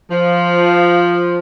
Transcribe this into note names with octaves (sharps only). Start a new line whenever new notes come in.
F3